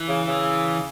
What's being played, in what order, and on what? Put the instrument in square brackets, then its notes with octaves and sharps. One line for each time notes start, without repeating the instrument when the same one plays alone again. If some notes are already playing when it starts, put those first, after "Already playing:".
Already playing: [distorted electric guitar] E3
[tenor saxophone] C#3
C#3